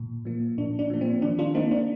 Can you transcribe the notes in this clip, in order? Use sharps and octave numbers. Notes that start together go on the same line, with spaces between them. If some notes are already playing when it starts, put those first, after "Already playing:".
Already playing: A#2
F3 A#3
A#2 D4
D4
F3 A#3
C4
D#3 D4
D4 F4
A#3 C4 D#4
D4